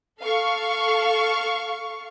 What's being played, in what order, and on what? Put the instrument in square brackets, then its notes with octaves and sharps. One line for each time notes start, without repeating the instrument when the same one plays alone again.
[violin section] A4 F5 C#6